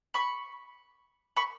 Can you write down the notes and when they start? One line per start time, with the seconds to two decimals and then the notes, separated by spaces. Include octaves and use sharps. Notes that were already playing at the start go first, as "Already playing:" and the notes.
0.14 B5 C#6
1.36 B5 C#6